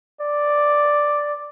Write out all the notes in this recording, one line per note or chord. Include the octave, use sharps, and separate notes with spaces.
D5